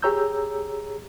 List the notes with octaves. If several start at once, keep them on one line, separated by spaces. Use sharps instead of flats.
G4 G#4 C#5 A#5 E6 G6